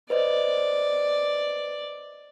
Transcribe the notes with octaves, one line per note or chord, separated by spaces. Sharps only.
B4 C5 D5 D#5